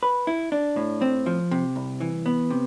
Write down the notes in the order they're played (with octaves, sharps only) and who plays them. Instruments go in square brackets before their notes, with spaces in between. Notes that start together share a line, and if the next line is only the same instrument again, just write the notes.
[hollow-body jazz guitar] B4
E4
D4
A2
C4
F3
C3
C2
E3
B3
C3